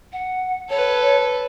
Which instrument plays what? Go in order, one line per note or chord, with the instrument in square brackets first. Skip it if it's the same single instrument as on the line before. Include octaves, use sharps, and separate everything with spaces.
[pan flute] F#5
[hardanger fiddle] A4 B4 [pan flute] C#5